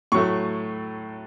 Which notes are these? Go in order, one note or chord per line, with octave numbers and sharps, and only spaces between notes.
A2 F#3 A3 C#6